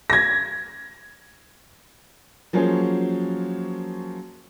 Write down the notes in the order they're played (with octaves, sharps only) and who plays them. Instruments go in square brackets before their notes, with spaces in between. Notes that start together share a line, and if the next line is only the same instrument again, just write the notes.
[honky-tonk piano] G#6 A#6
[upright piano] F3 F#3 A#3 C#4 G#4 C5